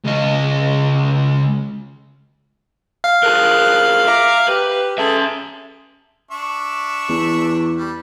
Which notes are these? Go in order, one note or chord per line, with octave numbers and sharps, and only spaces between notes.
C#2 D#5
F5
F4 G#4 A#4 F#6
E5 A#5 D6
G4 B4
C#4 G#4 A4 E5
D4 E5 C#6
E2
G3